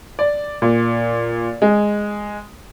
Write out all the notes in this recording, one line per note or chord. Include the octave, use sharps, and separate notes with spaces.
D5
A#2
G#3